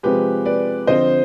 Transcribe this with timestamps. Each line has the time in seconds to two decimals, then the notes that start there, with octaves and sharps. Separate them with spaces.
0.03 C3 F3 G#3 G4 B4
0.45 B4 D5
0.87 D3 F3 C4 C5 D#5